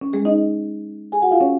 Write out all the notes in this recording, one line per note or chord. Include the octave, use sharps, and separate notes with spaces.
C#4
G#3 G#4
D#4 D#5
G#4 G#5
F#4 F#5
F4 F5
C#4 C#5